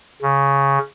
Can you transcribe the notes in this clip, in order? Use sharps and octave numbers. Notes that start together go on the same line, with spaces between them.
C#3